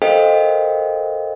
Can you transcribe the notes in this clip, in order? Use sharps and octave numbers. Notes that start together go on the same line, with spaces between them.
A4 A#4 C5 D#5 F5 G5